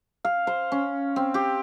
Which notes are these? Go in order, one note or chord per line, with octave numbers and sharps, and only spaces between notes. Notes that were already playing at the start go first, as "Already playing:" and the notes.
F5
C5
C#4
C4
G4